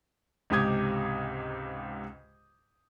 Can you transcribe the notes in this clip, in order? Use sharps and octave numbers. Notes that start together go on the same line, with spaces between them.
C#2 G#2 C3 G4 D#6 G#6